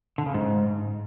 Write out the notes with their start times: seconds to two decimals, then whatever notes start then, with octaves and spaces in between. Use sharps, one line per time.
0.18 D3
0.26 C#3
0.34 G#2